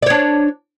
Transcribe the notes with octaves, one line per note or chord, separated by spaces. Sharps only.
D4 C#5 D5